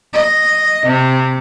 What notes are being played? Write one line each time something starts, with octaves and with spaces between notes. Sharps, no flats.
D#5
C3